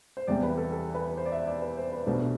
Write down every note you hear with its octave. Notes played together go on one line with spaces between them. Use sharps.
C5
E2 C3 G3 C4 D5
B4
A4
A4
B4
C5
D5
E5
D5
B4
C5
B4
C2 B2 A3 D4 C5